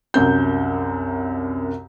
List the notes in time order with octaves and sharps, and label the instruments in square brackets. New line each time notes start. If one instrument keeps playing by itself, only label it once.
[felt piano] C2 F#2 G6